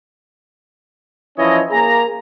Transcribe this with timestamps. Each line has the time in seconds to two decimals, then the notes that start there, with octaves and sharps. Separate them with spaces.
1.38 E3 F3 C#4 E4 C#5 D#5
1.70 A#3 G#4 A#5